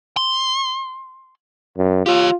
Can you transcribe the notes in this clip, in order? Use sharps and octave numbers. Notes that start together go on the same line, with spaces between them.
C6
F#2
F4 G4 C#5